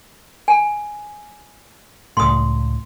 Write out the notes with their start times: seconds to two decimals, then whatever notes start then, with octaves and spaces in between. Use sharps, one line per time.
0.48 G#5
2.17 C#2 A2 C6 D#6